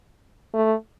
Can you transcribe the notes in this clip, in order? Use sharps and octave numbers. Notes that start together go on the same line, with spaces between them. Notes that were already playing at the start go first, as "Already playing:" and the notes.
A3